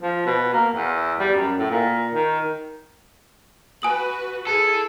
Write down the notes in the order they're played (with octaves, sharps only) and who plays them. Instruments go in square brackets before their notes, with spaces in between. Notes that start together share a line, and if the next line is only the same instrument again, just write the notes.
[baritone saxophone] F3
B2
A#3
E2
G3
F#2
A2
A#2
D#3
[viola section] F#4 B4 [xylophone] G#5 D#6 F#7
[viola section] E4 G#4 [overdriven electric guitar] A4